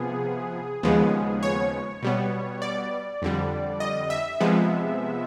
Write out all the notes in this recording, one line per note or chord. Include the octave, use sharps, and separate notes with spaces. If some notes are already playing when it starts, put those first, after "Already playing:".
Already playing: C3 F3 B3 G#4
D#2 C#3 F3 G#3 B3
C#5
B2 G3 B3
D5
F2 D3 G3
D#5
E5
C3 F3 G#3 B3